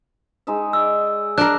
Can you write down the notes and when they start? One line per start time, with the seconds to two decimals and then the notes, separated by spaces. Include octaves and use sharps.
0.47 G#3 D#4 E5
0.73 D5 E6
1.38 D4 A#4 F#6